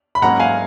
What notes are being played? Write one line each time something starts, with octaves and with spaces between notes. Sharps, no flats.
B5
G#2 F#3 A#3 C#4 F#5 A#5
F5 G#5